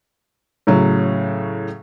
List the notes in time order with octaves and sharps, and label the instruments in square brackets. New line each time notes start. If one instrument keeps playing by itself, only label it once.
[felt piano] A2 C#3 F#3